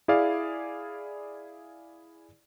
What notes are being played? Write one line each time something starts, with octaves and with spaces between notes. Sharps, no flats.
E4 G#4 D5 F5